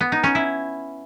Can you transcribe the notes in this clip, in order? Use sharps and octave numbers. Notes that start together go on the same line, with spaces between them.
B3
D#4
C#4
E4